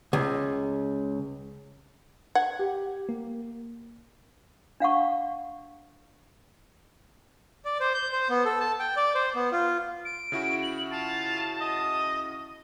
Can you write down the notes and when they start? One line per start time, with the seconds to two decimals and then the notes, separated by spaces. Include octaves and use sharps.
0.13 C#2
2.35 F#5 G#6
2.59 G4
3.09 A#3
4.80 D4 F5 F#5 C#6
7.65 D5
7.80 C5
7.94 G6
8.12 C5
8.29 B3
8.45 A4
8.60 A5
8.79 G5
8.96 D5
9.15 C5
9.35 B3
9.52 F4
10.05 D7
10.32 C#3 E4 F#4
10.62 F#7
10.92 F4 A5
11.61 D#5